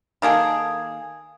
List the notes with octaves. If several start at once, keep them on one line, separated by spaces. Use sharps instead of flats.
D#3 A#3 G#4 A4